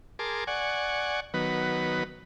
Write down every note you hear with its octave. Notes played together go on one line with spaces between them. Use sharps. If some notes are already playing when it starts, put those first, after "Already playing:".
G#4 A#4 A5 C6 D6
D5 F#5 G#5 C#6
D#3 F#3 B3 B4